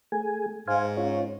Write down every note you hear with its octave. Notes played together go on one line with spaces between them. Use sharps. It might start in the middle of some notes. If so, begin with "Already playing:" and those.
A3 G#4 G#5
G#2 C5 F5 G#5
C#4 F4 C#5